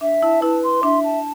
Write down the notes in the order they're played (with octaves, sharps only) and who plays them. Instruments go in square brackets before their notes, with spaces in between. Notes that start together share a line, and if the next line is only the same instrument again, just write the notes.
[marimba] D4 [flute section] E5
[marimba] E4 [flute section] A5
[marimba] E4 [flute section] B4
[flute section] C6
[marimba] D4 [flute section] E5
[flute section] A5